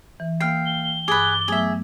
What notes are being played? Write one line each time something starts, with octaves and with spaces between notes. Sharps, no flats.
E3
A#3 G5 F6 C7
G7
G2 G#4 B4 D6 A6
F#3 A3 B3 G#4 E5